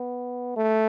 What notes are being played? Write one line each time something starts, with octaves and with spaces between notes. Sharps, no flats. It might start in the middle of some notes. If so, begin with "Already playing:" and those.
Already playing: B3
A3